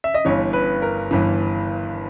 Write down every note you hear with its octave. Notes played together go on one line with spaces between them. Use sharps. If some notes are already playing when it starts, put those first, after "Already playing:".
E5
D#5
G1 G2 E3 C#5
B4
A#4
G1 G2 E3